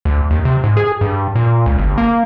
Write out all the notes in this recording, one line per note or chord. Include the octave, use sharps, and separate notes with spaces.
D2
D#2
C3
G#2
G#4
G2
A#2
C#2
G1
A#3